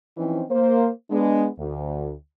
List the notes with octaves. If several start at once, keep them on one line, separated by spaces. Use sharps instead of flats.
E3 F3 C4 C#4 D#4 E4
A#3 C5
G#3 B3 D4
D2